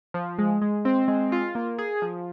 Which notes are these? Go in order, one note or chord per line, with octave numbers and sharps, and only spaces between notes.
F3
G#3
G#3
C4
G#3
F4
A#3
G#4
F3